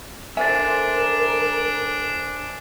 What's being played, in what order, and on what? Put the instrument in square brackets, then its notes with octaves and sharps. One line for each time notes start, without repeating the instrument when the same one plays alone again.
[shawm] D4 [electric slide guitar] A4 C5 E5 [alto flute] A#4 [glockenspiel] G#5 A6